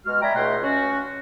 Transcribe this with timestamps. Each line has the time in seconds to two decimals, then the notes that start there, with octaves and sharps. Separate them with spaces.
0.04 B2 G#3 F#4 F6
0.21 D5 E5 G5 G#5 A#5 B5
0.34 C#2 B2 A3 D#4 F#5 C6
0.61 C#4 F#4